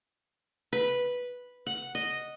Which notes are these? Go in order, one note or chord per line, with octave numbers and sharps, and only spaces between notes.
B4
F#5
D#5